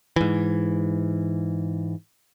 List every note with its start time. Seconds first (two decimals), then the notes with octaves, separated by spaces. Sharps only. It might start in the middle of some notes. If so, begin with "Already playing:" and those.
0.16 G#2 E3